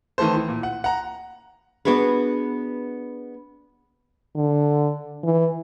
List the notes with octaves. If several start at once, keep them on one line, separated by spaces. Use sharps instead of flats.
D#3 E3 A3 A4 C5
E3
A#2
F#5
F#5 A#5
B3 D4 F#4 G#4 B4
D3
E3